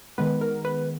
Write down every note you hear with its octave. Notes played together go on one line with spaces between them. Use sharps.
D#3 G#3 B3 B4
A#4
B4